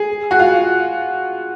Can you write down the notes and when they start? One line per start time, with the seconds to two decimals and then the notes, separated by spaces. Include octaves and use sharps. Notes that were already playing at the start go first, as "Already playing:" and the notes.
Already playing: G#4
0.31 F#4
0.39 F4